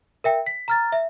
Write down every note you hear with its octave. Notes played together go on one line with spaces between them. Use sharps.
A#4 E5 G5
B6
A#5 F6 A6
E5